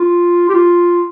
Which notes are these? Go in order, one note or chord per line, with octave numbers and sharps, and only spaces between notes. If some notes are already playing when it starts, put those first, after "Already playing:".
Already playing: F4
G4
F4